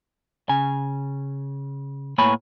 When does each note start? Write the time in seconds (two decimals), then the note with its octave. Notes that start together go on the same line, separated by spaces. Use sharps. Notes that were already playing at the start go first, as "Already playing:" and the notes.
0.49 C#3 G#5
2.18 A2 A#3 B3 C#5 G#5 B5